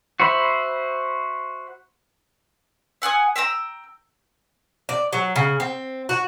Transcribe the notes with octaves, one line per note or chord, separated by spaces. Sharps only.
F#4 C5 E5 B5
E5 F#5 G#5 D#6
E5 G5 A#5 E6
D5
F#3
C#3
C4
F#4